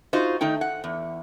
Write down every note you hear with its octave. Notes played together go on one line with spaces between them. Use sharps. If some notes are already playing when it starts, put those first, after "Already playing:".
D#4 F4 F#4 C5
D#3 A3 D#4 G5
F#5
E2